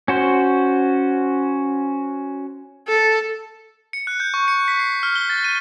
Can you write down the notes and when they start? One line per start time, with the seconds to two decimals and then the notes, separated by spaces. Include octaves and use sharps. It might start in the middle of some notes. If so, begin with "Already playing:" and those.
0.08 C#4 F#4 C5
2.89 A4
3.93 C#7
4.07 F#6
4.20 G6
4.34 C#6
4.48 C#7
4.68 B6
4.79 C7
5.03 F6
5.15 G7
5.30 A6
5.44 D#7